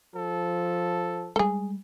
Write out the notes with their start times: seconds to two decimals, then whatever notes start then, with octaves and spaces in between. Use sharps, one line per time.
0.15 F3 A4
1.36 G3 G#3 G#4 A4